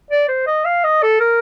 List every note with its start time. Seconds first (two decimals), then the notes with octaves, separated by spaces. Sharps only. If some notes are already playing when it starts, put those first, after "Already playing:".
0.11 D5
0.28 C5
0.47 D#5
0.65 F5
0.84 D#5
1.03 A4
1.20 A#4